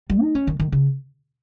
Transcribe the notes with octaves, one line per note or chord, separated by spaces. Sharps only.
G3
D#4
C#4
D#3
D#3
C#3